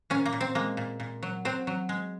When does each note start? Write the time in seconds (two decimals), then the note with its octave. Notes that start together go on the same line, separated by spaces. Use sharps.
0.10 A#2 C#4
0.26 A#3
0.32 A#2
0.41 C4
0.55 G#3 A#3
0.77 A#2
1.00 A#2
1.23 F#3
1.45 F#3 C4
1.67 F#3
1.89 G#3